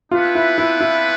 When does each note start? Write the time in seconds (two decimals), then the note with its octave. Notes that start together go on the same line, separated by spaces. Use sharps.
0.11 B3 D4 F4 G4 B4 E5
0.35 E4
0.58 E4
0.81 E4